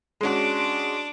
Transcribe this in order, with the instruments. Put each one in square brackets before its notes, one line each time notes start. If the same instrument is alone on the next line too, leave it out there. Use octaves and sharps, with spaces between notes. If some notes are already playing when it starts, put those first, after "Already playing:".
[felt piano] G#3 C#4 F#4 [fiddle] D4 D6